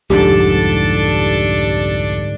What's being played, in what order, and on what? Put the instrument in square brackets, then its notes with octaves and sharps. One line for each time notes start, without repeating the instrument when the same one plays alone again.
[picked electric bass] C2 F2 [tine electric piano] G#2 D3 [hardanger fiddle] D4 A4 [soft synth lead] G4